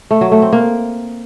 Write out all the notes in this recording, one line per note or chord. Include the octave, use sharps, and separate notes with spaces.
A3
F#3
A3
C4
A#3